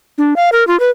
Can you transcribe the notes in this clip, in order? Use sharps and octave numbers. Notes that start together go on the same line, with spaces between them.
D4
F5
A#4
F4
B4